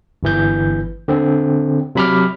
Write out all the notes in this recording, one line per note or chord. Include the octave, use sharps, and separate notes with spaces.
G1 E3 G6
D3 C4
C3 F#3 B5 D6 F6